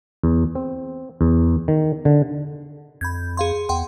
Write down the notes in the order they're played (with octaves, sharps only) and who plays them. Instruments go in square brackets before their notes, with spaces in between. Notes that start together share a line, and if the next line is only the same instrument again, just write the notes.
[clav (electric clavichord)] E2
C4
E2
D#3
D3
[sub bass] F2 [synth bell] B5 G6 G#6
[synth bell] G#4 F5 C6
[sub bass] E2 [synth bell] F#5 G5 C6